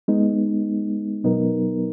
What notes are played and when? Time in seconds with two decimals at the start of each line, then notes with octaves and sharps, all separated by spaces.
0.08 G#3 B3 D#4
1.24 B2 F#3 B3 D#4 A#4